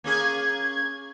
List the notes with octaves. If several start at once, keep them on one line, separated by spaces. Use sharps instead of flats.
A#3 C#4 G#4 G#6